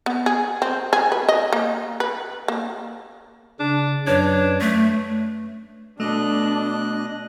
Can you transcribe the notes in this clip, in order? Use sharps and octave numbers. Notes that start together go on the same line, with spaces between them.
B3
G#4
C4
G#4
B4
D#5
A#3
B4
A#3
C#3 D4
F#2 F#3 D4 B4 C#5
A3
B2 A3 D4 D#5 F#6